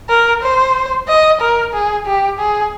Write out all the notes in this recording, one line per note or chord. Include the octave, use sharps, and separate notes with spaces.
A#4
C5
D#5
A#4
G#4
G4
G#4